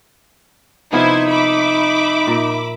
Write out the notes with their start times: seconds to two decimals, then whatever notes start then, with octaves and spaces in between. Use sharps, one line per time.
0.93 C3 F3 B3 D#4 E4 C5 G#6
1.29 E5 B5 D6
2.27 A#2